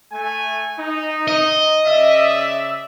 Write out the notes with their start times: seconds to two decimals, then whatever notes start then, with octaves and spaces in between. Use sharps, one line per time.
0.12 A3 G#5
0.78 D#4
1.28 D#5
1.86 C#3 D5 E5